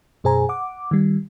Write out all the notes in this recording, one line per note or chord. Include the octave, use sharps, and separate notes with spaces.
F#2 B2 G#4 C5 G#5 A#5
F#5 D6
D#3 G3